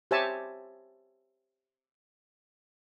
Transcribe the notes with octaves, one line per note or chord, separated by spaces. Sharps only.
G4 C5 C#5 E5 G#5 A5